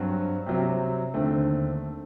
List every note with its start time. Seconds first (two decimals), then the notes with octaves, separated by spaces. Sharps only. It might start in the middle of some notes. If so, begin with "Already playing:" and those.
Already playing: G2 F#3 C4 F#4
0.46 C3 F#3 C4
1.14 D#2 D3 A3 C4